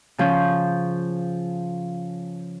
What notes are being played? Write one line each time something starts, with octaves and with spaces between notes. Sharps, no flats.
C#3 F3 C#4 G6